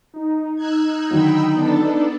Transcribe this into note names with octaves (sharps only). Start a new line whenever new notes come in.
D#4
E6 F#6 G#6
D3 D#3 F#3 G5 B5 E6
B3 D4 A4